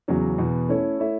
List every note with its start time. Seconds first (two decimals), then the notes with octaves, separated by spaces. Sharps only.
0.08 E2 C#3 F#3 C#4
0.38 E2 B2 B3
0.69 A3 C#4 E4 A4 C#5
0.99 A3 E4 C#5 E5